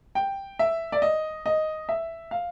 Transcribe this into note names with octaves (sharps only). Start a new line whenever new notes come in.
G5
E5
D5
D#5
D#5
E5
F5